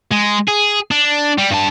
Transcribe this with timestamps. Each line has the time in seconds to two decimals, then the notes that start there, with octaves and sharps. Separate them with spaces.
0.11 G#3
0.48 G#4
0.91 D4
1.38 G3
1.51 G2 A5